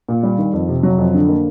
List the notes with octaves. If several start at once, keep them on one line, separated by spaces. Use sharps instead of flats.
A#2
G3
D#3
F2
C3
F#3
F2
D3
A#3